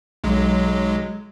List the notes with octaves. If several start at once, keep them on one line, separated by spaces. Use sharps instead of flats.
B1 F#3 G#3